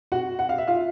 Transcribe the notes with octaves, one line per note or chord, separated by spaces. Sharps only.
F#4 F#5
F#5
F5
E5
F4 F5